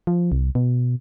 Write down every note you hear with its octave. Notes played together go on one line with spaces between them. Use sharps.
F3
C2
B2